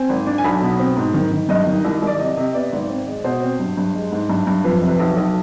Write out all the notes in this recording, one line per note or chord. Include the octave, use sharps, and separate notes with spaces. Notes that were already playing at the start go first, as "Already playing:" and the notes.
Already playing: C4 G#5
G#1
D4
G#5
B1 B5
B2
C4
G#2
D#3
D#3
G2 D#5
D#3
C2
C2 D5
C3 D#5
C3 D#5
B3 D5
G#1
C4
G#3
B2 C5
C4
G2
G2
G#3
G#2
G2
G2
F2 B4
C3
B4
B1
B1